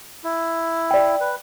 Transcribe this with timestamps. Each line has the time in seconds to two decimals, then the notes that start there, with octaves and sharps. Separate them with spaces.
0.24 E4
0.91 D5 G5
1.21 B4